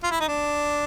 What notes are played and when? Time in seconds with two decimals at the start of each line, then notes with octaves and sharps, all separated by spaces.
0.04 F4
0.11 E4
0.21 D#4
0.28 D4